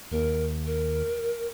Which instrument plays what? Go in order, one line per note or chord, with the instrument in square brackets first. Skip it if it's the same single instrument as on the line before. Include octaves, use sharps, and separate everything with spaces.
[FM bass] D#2 [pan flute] A#4
[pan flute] A#4